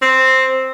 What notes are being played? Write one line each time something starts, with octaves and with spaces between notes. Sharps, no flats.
C4